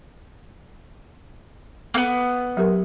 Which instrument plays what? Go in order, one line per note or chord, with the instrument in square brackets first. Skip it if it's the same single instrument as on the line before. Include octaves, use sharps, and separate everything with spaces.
[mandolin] A#3 B3
[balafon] F#3 G4 A#4